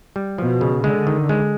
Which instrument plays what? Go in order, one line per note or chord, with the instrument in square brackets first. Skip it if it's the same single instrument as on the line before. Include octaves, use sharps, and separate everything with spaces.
[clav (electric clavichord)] G3
[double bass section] B2 [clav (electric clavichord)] F3
[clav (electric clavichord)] C#3
[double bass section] D3 [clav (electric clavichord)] G#3
[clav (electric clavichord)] D#3
G#3